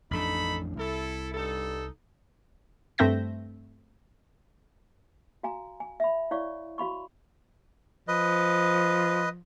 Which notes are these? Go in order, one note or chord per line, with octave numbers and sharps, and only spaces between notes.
A1 F2 D4 D#4 A4 B5
C2 E4 A4
G2 D#4 A4
G2 A3 C4 E5 G6 A#6
F#4 F5 G#5 A#5
G#5
E5 B5
E4 C#5 D5 F5 C#6
F#4 F5 B5 C#6
F3 B4 D#5